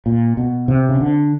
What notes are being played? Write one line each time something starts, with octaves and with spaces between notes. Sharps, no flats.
A#2
B2
C3
C#3
D3